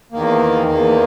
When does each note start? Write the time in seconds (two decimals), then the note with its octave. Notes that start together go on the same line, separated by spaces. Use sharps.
0.12 E2 D#3 A#3
0.66 E2 D#3 A#3